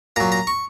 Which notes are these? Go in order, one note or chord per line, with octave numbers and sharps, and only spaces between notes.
A#2 F#3 A#5
A#5
C#6